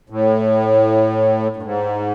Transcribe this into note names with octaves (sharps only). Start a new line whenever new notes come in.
A2
G2
G#2